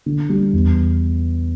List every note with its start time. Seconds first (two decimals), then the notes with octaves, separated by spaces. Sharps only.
0.06 D3
0.29 G3
0.53 E2